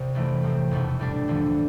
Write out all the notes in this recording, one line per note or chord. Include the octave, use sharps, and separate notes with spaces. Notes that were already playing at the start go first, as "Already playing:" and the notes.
Already playing: C2 C3
F1 F2 E3 A3 C4
A1 A2 F3 C4
F1 E2 B2 A3
A2 G3 D4
E2 D3 F3